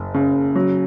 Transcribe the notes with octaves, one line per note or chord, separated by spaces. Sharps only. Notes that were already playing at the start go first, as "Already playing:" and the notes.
Already playing: F#1
C#3
F#3